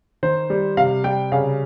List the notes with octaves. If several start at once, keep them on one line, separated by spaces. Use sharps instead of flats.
D#3 C5
G3
C3 F5
G3 G5
C#3 F5